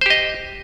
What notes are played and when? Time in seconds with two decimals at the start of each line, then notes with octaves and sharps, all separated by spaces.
0.01 C5
0.06 G4
0.10 D#5